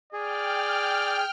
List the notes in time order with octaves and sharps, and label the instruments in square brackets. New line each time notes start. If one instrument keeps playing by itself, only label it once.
[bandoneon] G#4 [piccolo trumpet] D5 [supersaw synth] G5 F6